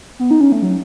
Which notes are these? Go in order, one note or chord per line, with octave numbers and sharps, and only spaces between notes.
B3
D#4
C#4
A3
F#3